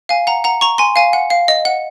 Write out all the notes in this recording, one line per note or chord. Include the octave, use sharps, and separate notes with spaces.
F5 G#5
F#5 A#5
F#5 A#5
A#5 C#6
G#5 C6
F5 G#5
F#5
F5
D#5
F#5